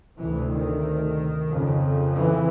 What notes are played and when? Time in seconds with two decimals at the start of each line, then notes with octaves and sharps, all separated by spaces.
0.19 D2 C3 E3
0.52 D#3
1.50 F2 C#3
2.16 E3